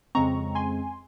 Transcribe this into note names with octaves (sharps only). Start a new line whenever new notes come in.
F2 C#3 G#3 C4 A#5 C#6
G#5 C6